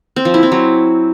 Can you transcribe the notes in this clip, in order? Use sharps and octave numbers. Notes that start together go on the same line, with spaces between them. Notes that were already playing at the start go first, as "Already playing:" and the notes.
C4
F3
E4
C4
F#3